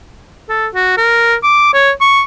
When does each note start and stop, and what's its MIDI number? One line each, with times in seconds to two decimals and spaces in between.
0.49 0.67 69
0.75 0.97 66
0.97 1.35 70
1.43 1.72 86
1.73 1.91 73
2.01 2.23 85